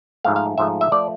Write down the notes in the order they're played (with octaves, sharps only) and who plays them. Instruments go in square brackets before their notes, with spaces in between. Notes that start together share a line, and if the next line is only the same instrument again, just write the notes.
[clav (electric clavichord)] G#2 F3 A3 F5
F5
G#2 F3 A3 E5
E5
F3 A3 D5